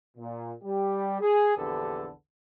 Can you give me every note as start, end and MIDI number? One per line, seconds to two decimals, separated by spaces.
0.17 0.51 46
0.62 1.18 55
0.62 1.18 67
1.20 1.56 68
1.56 2.09 34
1.56 2.09 40
1.56 2.09 50
1.56 2.09 67
1.56 2.09 69
1.56 2.09 71